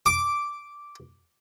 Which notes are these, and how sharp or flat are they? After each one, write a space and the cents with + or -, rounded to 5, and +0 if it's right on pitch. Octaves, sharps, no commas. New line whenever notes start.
D6 -5